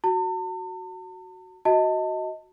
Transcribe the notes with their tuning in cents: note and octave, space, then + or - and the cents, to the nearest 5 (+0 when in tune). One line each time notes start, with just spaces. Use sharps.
F#4 +0 A5 +45
F#4 +0 D#5 +20 A5 +25